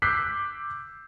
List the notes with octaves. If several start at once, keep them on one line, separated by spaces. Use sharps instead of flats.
D6 E6 F#6 G6 B6 C7